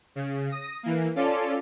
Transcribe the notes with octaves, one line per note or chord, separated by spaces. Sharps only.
C#3
D#6 A#6
E3 A#3
C#4 F4 A4 D5